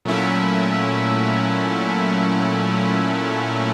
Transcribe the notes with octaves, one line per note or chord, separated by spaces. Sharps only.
A#2 F#3 A3 C#4 E4